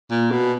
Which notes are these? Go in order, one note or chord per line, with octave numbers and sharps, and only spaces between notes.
A#2
B2